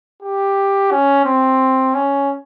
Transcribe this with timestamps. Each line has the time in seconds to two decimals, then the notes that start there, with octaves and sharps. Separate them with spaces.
0.22 G4
0.91 C#4
1.25 C4
1.94 C#4